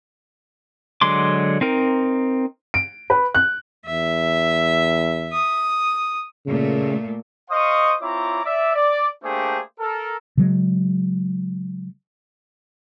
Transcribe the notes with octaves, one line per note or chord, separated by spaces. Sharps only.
D3 F#3 G#3 C6 D6
C4 D#4 A#4
D7
B4
F#6
E2 E5
D#6
A#2 C#3 A3
C5 D#5 F5 C#6 D#6
C4 E4 F4 C#5 A#5 D6
D5 E5
D5
A3 A#3 D4 G4 G#4 C5
A4 A#4
C#3 F#3 G#3